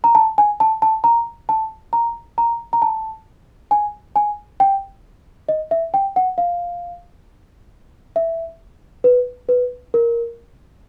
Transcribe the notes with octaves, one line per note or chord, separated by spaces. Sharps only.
A#5
A5
G#5
A5
A5
A#5
A5
A#5
A#5
A#5
A5
G#5
G#5
G5
D#5
E5
G5
F#5
F5
E5
B4
B4
A#4